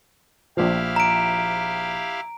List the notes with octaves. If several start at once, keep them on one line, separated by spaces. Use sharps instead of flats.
A#1 F3 E4 G4 F5
A#5 D7